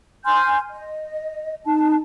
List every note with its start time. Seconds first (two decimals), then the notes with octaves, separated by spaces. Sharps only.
0.25 G#5 C6 F6 G6
0.70 D#5
1.65 D#4 A5